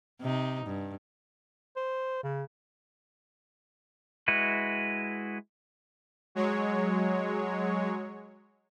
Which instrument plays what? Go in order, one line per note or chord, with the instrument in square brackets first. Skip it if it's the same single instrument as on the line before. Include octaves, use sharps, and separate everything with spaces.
[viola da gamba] C3 D#4
G2
[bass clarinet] C5
C#3
[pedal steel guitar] G#3 E4 F#4 B4
[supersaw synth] F#3 G#3 C#5